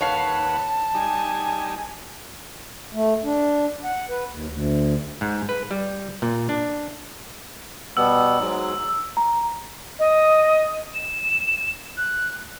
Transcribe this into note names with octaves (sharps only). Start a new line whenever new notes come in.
D#2 B4 C#5 F5 F#5 A5
G3 D#4 G#5
A3
D4
F#5
B4
D#2
D2
G#2
B4
G3
A#2
D4
B2 G3 B3 E6
G#2 F#3
A#5
D#5
E7
F#6